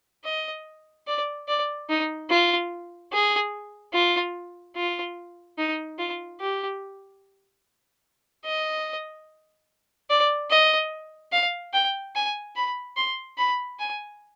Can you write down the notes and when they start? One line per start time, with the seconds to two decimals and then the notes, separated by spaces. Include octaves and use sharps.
0.25 D#5
1.07 D5
1.48 D5
1.89 D#4
2.30 F4
3.12 G#4
3.93 F4
4.76 F4
5.58 D#4
5.99 F4
6.40 G4
8.45 D#5
10.10 D5
10.50 D#5
11.32 F5
11.74 G5
12.15 G#5
12.56 B5
12.97 C6
13.38 B5
13.79 G#5